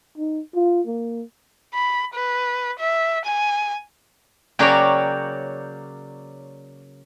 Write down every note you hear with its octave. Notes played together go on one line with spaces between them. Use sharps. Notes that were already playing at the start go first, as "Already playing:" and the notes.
D#4
F4
A#3
B5
B4
E5
G#5
C#3 F#3 A#3 C#5 D5 G5